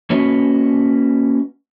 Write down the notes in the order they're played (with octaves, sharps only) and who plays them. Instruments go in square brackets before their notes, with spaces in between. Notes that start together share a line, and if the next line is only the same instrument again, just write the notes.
[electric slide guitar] A#3 C#4 F#4 B4 C#5 D#5